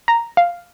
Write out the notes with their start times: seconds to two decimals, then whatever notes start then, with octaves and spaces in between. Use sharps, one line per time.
0.08 A#5
0.37 F5